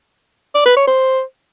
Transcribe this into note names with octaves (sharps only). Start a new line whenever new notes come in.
D5
B4
C#5
C5